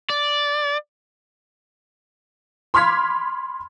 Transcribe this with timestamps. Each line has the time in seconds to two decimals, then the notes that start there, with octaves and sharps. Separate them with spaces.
0.10 D5
2.74 B5 C6 D6 F6 G#6 B6